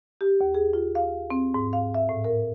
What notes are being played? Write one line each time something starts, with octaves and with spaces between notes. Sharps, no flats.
G4
D#2
G#4
F4
F5
C4
G#2
F5
E5
A2
A#4